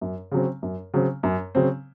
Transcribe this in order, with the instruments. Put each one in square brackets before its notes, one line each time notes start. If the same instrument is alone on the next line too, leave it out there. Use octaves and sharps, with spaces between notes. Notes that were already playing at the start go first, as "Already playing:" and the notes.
[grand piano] F#2
C#3 F#3 C4
F#2
C#3 F#3 C4
F#2
C#3 F#3 C4